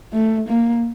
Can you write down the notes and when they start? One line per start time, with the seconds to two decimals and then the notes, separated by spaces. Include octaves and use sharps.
0.13 A3
0.48 A#3